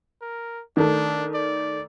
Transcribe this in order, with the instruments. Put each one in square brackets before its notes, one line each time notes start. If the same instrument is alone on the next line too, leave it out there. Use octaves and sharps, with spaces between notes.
[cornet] A#4
[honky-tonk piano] D#3 A3 [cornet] D4
[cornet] D5